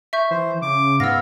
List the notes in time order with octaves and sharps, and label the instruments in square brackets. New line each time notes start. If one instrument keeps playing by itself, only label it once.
[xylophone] E5 C#6 G6
[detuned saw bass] E3 [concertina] C5
[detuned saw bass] C#3 [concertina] D6
[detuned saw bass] G#2 [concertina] B3 F5 [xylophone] E6 A#6